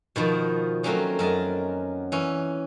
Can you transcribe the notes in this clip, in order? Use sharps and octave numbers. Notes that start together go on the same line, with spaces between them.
B2 D#3 F3
F#3 A3 A#3 C4 C#4 F4
F#2 A#4 D#5 A5
E3 C#4